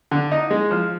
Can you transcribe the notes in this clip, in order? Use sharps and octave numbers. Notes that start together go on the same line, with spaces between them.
D3
D#4
G#3
F3